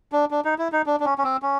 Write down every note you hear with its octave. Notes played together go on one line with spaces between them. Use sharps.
D4
D4
D#4
E4
D#4
D4
D4
C#4
C#4
C4
C#4